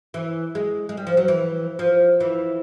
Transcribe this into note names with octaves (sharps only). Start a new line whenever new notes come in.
E3
G#3
G#3
G3
F3
F#3
E3
F3
E3